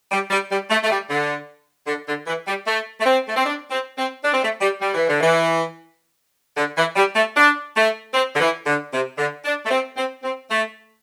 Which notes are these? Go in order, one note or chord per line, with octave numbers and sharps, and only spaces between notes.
G3
G3
G3
A3
A3
G3
D3
D3
D3
E3
G3
A3
A3
C4
A3
C4
D4
C4
C4
D4
C4
A3
G3
G3
E3
D3
E3
D3
E3
G3
A3
D4
A3
C4
D3
E3
D3
C3
D3
D4
A3
C4
C4
C4
A3